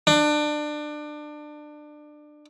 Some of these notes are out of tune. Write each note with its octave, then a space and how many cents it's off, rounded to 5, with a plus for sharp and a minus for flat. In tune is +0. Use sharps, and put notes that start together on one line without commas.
D4 +25